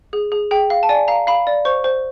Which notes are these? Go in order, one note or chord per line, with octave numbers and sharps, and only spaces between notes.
G#4
G#4
G#4 G5
F5
A5
D5 G#5
F5 A#5
F5 B5
D5
C5 C#6
C5